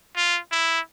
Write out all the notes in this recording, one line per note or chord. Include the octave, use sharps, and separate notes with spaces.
F4
E4